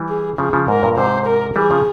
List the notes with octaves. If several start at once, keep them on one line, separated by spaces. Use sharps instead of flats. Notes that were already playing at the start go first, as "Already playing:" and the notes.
Already playing: E3 G3
G#4
C#3 F3 G#4
C#3 F3
G#2 A#4
G2 A#2
G#2 C3 C5
A#4
E3 G3 G#4
C#3 F3